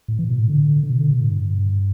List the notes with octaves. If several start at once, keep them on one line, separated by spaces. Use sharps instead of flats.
A2
E3
A2
B2
A2
D3
D3
B2
D3
B2
A2
G2